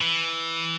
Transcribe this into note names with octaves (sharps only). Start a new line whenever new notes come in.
E3